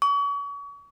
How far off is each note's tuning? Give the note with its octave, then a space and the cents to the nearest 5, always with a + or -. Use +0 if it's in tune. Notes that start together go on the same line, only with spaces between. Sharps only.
C#6 +40